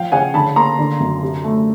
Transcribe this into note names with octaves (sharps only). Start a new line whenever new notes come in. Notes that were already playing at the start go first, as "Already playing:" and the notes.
Already playing: F3 F5 G5
C#3 F#5 G#5
D3 A5 B5
A#3 A#5 C6
D3
F#2
C3
A3